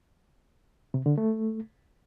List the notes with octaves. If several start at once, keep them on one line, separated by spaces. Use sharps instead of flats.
C3
D3
A3